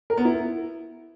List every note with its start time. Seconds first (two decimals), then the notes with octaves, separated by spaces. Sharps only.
0.10 A#4
0.17 B3
0.25 E4